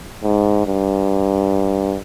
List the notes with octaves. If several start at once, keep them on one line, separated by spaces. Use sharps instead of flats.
G#2
G2